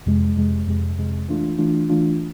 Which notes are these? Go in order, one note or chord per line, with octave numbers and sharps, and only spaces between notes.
F2 C3 G#3
F2 C3 G#3
F2 C3 G#3
F2 C3 G#3
E3 A3 D4 F4
E3 A3 D4 F4
E3 A3 D4 F4